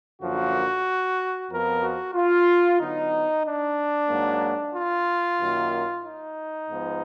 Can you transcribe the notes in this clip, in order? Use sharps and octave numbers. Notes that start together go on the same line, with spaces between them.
F#2 D3 F3 A#3 F#4
F2 F3 B3 A#4
F#4
F4
D3 F#3 B3 D#4
D4
G#2 F#3 A#3
F4
F#2 D#3 A#3
D#4
G#2 F3 B3